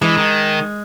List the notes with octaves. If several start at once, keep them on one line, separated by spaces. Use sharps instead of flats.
E3 G#3
D#3